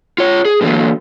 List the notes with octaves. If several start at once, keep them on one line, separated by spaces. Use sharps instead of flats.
F4 C#5
G#4
A2 D3 E3 F#3 A#3